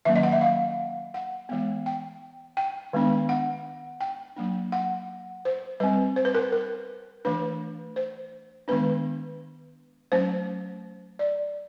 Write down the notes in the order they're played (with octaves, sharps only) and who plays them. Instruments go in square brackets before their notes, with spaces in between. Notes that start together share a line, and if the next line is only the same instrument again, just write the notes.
[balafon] D#3 F#3 A#3 C#4 E5
D#5
F#5
E5
F5
F#5
E3 G#3 B3
G5
G5
D#3 G#3 B3 D4
F#5
G5
F#3 A#3 D4
F#5
C5
G3 C4 B4
C5
B4
A#4
A#4
E3 A3 D4 B4
C5
D#3 G#3 B3 D4 B4
F#3 A3 C#4 C5
D5